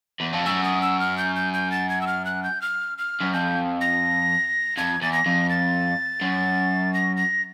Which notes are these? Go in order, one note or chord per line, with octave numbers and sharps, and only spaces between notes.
E2
F2
F#2 E6
D#6
E6
F6
G6
G6
G6
A6
G#6
E6
F6
F#6
G6
F6
F6
F#2
F2 G6
A#6
F2 G#6
E2 A6
A#6
F2
A6
F#2
A#6
A#6